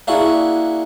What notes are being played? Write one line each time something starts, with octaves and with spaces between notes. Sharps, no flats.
A#3 D4 E4 F#4 G#4